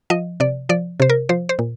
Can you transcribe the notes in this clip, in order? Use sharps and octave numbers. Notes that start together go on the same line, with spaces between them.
F3 D#5
C3 D5
F3 D5
C3 C5
A#4
F3 C5
C5
A#2